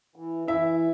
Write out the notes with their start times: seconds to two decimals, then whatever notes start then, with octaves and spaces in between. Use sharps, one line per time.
0.16 E3
0.48 E3 E4 E5